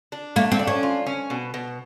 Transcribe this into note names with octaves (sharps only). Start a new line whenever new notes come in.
D4
A3 A#3
C4
D4
C#4
F4
C#4
B2
B2